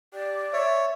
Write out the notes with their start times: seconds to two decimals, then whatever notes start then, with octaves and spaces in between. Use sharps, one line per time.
0.13 G4 D5
0.53 C#5 E5